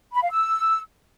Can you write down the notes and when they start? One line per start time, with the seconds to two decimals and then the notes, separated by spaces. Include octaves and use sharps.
0.14 B5
0.23 F5
0.31 E6